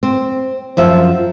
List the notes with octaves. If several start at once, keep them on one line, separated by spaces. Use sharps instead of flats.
C4
F#2 F3 E5